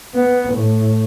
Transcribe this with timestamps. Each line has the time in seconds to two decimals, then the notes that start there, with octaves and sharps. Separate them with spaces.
0.15 B3
0.54 A2